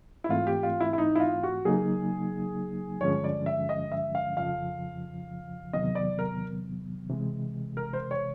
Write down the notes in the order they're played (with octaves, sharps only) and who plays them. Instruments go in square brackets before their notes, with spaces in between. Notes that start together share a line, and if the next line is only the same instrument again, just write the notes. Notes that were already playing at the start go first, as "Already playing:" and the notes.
[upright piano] E4
[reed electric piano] G#2 E3 A3 C4 [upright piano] F4
[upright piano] G4
F4
E4
E4
D#4
E4
F4
F#4
[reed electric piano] C#3 F#3 A#3 D#4 [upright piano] G#4
[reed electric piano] G2 D3 F3 G#3 C#4 [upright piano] C#5
[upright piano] D5
E5
D#5
E5
F5
[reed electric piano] F2 C#3 F3 [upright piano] F5
[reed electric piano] E2 C3 D#3 F#3 B3 [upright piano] D#5
[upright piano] D5
A#4
[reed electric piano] C3 E3 G#3
[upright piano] A#4
C5
C#5